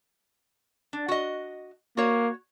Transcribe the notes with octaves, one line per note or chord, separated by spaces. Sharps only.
D4
F#4 D#5
A#3 F#4 C#5